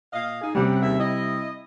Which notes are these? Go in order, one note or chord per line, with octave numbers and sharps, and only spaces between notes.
A#2 D#5 F5
D#4 G#4
F#2 C3 G3 G4 F#5
D#2 C#3 E5
E4 D#5